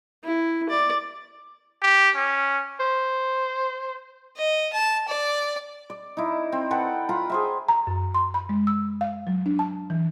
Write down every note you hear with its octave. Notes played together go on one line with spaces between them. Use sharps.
E4
D5
G4
C#4
C5
D#5
A5
D5
D5
D#4 E4
C4
A4 B4 F#5 G5
F4 A#5 B5
G#4 C5 E5
A#5
F#2
C6
B5
G#3
E6
F5
F#3
D4
A5
E3